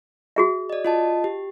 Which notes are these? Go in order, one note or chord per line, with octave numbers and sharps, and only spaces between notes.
F#4 G#4 E5
D5 D#5
F4 D#5 A5
G4